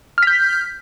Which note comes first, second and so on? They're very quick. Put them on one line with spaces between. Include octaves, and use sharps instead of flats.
F6 B6 G6